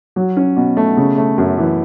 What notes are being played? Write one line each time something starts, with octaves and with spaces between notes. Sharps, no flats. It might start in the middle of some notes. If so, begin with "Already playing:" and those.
F#3
C#4
B2
A3
C#3
A3
F#2
E3